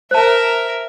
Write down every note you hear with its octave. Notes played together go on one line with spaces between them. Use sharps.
A#4 C5 E5 A5